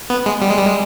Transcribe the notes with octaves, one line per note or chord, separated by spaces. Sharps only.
B3
G#3
G3
G#3
G3
G#3